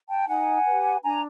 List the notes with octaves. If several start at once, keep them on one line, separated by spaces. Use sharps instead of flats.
G5 A5
D#4 F#5 G#5
G4 B4
D4 G#5 A#5